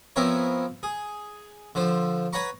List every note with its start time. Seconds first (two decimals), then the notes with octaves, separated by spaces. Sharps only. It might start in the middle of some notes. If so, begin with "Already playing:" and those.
0.16 F3 B3 C4 E4 A#4 C#5
0.83 G#4
1.75 D3 F3 C5
2.33 B4 C#5 F#5 A#5 B5 C#6